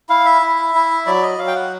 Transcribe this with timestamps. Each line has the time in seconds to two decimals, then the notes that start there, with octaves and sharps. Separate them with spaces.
0.09 E4 F5
0.26 E5
0.42 E4
0.75 E4
1.07 F#3 D5
1.23 D#5
1.39 F#3 F5
1.47 G5
1.55 F#5